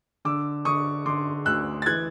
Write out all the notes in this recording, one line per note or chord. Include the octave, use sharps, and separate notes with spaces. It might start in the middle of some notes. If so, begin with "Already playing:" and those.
D3 D6 E6
D3 C#6 D#6
D3 C6 D6
D2 E6 F#6
A6
E3 F#6 G#6